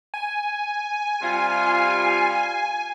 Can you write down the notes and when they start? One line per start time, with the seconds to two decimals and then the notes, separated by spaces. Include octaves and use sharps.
0.14 G#5
1.22 C3 G3 F4